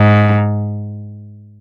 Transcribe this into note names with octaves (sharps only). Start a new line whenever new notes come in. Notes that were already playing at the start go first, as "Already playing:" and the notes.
Already playing: G#2